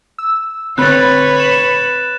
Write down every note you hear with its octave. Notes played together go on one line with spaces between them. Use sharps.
E6
D3 C4 B4 C#5 B5 F#6 A6
E7